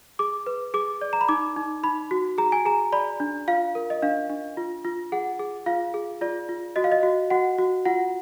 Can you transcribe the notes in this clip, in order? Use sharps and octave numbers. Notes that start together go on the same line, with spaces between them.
G#4 D6
B4
G#4 D6
D5
A#5
B5
D#4 D6
D#4
D#4 B5
F#4
G#4 A#5
G#5
G#4 A#5
D5 B5
D4
F4 F5
A#4
D#5
D4 F5
D4
F4
F4
G#4 F#5
G#4
F4 F5
G#4
F4 D5
F4
F#4 D#5
F5
D#5
F#4
F#4 F#5
F#4
F4 F#5